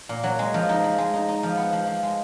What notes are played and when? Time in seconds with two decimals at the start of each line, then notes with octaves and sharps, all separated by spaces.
0.09 A#2
0.23 F#3
0.39 G#3
0.54 F3
0.69 D#4
0.84 F3
0.98 G#3
1.14 D#4
1.28 D#4
1.43 F3
1.57 B3
1.73 F3
1.87 F3
2.03 G#3